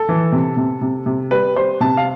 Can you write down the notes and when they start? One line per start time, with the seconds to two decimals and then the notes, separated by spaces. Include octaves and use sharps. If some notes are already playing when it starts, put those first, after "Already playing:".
Already playing: A4
0.09 E3
0.32 C3
0.57 C3
0.81 C3
1.06 C3
1.31 G3 B4
1.55 G3 C5
1.80 C3 A5
1.97 F5